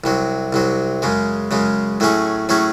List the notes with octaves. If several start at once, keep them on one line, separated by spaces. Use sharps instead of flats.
C2 C3 F#3
C2 C3 F#3
F#2 C#3 G#3
F#2 C#3 G#3
A2 F#3 A3 C#4 G#4
A2 F#3 A3 C#4 G#4